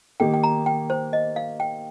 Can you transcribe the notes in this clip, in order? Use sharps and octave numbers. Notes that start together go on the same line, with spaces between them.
D#3 A#3 D#4 G4 G5
G5
A#5
G5
C5
D#5
F5
G5